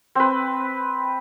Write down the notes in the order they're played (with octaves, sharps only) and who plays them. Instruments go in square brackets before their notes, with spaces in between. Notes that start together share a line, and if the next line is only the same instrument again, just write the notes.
[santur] C4 B4